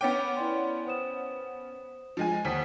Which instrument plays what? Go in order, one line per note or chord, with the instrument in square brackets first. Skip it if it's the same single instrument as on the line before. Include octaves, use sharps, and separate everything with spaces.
[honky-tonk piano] B3 C#4 G5 [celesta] D6 F6 A6
[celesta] E4 D5 C6
C5 D#6 E7
[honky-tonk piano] F3 G#3 G#5
[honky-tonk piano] D#2 B6 [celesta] C5 F#5 D#6